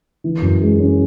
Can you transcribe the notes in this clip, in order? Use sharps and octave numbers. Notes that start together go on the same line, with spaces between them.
E3
F#2
G#3
C#4